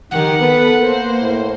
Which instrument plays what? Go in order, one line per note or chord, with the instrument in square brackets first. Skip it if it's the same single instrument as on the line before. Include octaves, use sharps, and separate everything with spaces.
[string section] D#3 G4 A#4 [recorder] F#5
[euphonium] B3 [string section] A4 B4
[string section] A#3 C5 [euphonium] A#4
[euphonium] A2